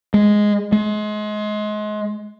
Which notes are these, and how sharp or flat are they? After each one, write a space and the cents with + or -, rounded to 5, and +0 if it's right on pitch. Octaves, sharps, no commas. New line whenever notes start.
G#3 +0
G#3 +30